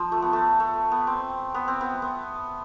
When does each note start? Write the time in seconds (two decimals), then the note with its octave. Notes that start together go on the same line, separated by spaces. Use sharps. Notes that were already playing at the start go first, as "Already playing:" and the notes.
Already playing: F3
0.12 A3
0.22 B3
0.33 A3
0.60 A3
0.91 B3
1.07 C4
1.54 B3
1.68 C4
1.81 B3
2.02 B3